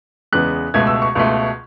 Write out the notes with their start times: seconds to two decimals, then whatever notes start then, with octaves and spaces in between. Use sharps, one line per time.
0.32 E2 C#3 G#3 B3 F#6
0.74 C#2 B2 A3 G#6
0.87 E6
1.02 C#6
1.15 C#2 B2 A3